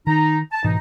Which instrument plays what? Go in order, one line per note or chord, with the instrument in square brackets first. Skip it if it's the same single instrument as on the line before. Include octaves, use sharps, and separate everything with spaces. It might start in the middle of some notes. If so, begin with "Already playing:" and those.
[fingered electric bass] D#3 [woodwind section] D#4 A#5
[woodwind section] A5
[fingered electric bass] G#2 B2 E3 [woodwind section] D#4